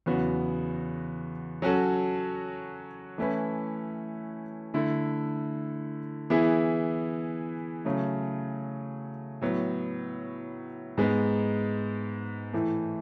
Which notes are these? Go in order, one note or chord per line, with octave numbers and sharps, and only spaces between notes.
E2 C#3 F#3 B3 F#4
F#3 C#4 F#4 A4
E3 A3 C#4 E4 B4
D3 A3 E4 A4
E3 B3 E4 G#4
C#3 F#3 A3
A2 F#3 B3
G#2 G#3 B3
A2 E3 A3